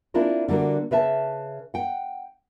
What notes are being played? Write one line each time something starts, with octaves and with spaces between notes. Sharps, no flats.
A#3 C4 D4 E4 F4 A#4
D3 G3 A#3 F#4
C#3 B4 E5 A5
F#5 G5